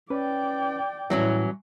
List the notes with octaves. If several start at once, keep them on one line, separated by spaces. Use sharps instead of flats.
C#4 B4 D5 G5
A2 E3 F#3 G3 C#4